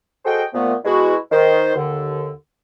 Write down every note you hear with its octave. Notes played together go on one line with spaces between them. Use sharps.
F#4 G#4 A4 C5 D#5 G5
A#2 F3 A3 B3
B2 G#3 E4 F#4
D#3 C5
D#2 D3